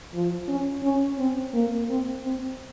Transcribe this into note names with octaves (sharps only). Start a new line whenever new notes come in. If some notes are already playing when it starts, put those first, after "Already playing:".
F3
C#4
C#4
C4
A#3
C4
C4